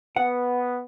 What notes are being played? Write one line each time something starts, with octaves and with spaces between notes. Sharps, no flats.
B3 F#5